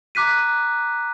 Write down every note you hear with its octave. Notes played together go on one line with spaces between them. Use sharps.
A#5 D6 F#6 B6 D#7